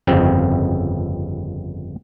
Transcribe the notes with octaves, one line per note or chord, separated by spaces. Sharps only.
G1 F2 C#3 C4